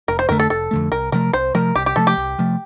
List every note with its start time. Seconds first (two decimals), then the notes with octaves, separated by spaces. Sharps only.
0.08 F1 A#4
0.19 C5
0.29 F2 D3 A3 A#4
0.40 A4
0.50 F1 A4
0.71 F2 D3 A3
0.92 C2 A#4
1.12 C3 F3 A3 A#4
1.33 C2 C5
1.55 C3 F3 A3 A#4
1.76 C2 G4
1.86 G4
1.96 C3 F3 A3 A4
2.07 G4
2.17 C2
2.38 C3 F3 A3